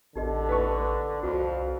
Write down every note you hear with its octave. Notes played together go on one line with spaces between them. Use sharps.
A1 D3 D#4 G4 D#5
B4 A5 C#6
C2 F2 F#4